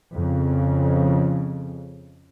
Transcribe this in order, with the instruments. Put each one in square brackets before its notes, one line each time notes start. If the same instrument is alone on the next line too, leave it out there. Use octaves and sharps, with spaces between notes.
[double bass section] F2 C#3